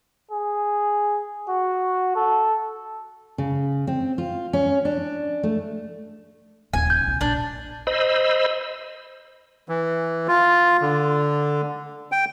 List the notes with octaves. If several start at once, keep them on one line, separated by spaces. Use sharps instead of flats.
G#4
F#4
A4
C#3
C4
F4
C#4
D4
A3
D#1 F3 G#5
G6
B1
A#1 D4
C5 D#5 B5 E6
E3
F4
D3
G5